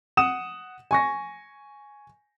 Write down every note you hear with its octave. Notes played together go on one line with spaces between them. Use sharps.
F#5 D#6 E7
G#5 C#6 A#6